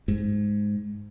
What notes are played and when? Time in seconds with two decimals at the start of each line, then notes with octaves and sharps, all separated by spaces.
0.08 G#2